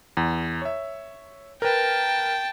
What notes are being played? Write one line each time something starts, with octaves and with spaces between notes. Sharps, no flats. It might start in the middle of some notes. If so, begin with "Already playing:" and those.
E2
C#5 E5
A#4 B4 G5 A5